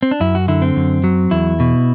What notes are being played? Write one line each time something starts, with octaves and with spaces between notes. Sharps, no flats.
C4
D4
F#2 E4
F#4
D3 E4
C4
F#2
F#3
E2 E4
B2